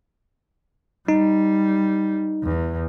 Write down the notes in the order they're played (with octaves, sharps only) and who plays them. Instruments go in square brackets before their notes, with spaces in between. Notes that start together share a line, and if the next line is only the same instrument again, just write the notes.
[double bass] G3 [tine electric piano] D#4
[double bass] E2